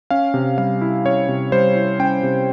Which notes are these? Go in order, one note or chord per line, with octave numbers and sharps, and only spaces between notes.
C#4 F5
C3
G3 F5
E4
C#4 C#5
C3
G3 C5
E4
C#4 G5
C3